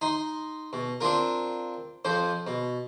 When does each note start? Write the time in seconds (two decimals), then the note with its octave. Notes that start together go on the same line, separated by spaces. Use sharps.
0.01 D#4 D#5 C6
0.73 B2
1.01 C4 D4 F4 A#4
2.05 F2 F3 C5
2.47 B2